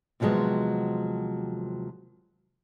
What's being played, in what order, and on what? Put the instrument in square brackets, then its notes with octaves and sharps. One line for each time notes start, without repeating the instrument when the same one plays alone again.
[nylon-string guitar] D#2 C3 F3 F#3 G#3 B3